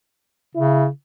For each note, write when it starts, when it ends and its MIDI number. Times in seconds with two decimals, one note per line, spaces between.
0.55 0.88 49
0.55 0.86 64